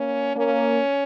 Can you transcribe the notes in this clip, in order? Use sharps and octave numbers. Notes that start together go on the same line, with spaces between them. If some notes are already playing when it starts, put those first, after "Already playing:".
Already playing: A#3 C#4
A#3 C#4